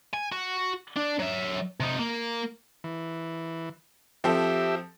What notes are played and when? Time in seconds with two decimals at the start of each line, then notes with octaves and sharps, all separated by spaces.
0.14 G#5
0.32 F#4
0.96 D4
1.19 F#3 E5
1.80 C3 D#4
1.99 A#3
2.84 E3
4.24 F3 C4 G4 A4 E5